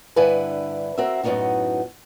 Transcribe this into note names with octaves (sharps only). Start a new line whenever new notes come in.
G2 D3 E4 B4 G#5
C4 F#4 A#4 E5
F#2 A2 D#3 B3 D#4 F#4